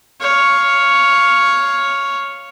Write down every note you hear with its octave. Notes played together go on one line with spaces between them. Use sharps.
C#5 F5